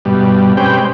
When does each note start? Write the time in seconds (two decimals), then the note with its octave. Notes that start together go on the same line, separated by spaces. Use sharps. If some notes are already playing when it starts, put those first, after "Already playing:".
0.05 G2 B2 G3
0.57 G#3 C4 C#4 G4 B4 G5